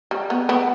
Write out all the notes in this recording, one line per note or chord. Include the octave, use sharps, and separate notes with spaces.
G3
B3
B3